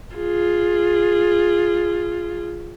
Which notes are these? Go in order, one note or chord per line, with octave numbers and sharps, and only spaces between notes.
F4 G#4